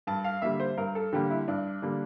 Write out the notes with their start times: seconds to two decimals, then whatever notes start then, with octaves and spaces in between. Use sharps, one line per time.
0.07 G2 A5
0.24 F5
0.42 D3 G3 A#3 E5
0.60 C5
0.77 G2 A#4
0.95 A4
1.13 D3 G3 A#3 G4
1.31 E4
1.48 G2 D4
1.82 D3 G3 A#3